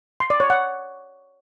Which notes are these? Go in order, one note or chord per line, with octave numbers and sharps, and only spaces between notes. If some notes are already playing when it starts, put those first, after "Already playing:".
C6
D5
C#5
F#5